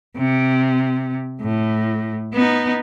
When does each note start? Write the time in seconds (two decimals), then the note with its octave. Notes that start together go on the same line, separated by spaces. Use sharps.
0.17 C3
1.41 A2
2.33 B3 D#4